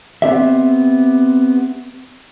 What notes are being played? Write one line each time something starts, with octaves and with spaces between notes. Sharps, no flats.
B3 C4 G4 E5